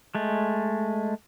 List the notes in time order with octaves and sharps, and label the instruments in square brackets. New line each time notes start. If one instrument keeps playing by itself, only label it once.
[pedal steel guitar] G#3 A3